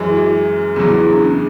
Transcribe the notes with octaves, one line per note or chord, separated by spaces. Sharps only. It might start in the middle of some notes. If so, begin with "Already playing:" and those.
Already playing: F#2 E3 G#3 C#4
E4
F#4
E2 C#3 F#3 G#4
E4
E4
D4
C#4